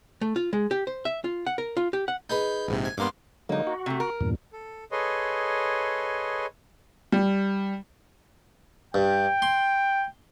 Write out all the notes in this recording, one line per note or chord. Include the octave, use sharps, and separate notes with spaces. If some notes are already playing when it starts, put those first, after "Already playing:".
A3
F4
G#3
G4
C5
E5
F4
F#5
A#4
F4
G4
F#5
D#4 G#4 B4 G6
A#1 G#2 C3
G#5
G2 A#3 B3 C6 D6
D3 F#3 G#3 A#3 D#4
F#4
C3 A3
A#4
E2 G2 A#2
A4
G#4 A4 B4 C#5 D#5 C6
G3
G2 G5
C6